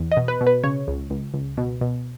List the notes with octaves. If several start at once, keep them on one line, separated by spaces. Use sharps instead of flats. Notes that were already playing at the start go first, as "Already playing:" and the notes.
Already playing: E2
D#5
B2
B4
B2
B4
C#3 C#5
C#2
C#2
C#2
B2
B2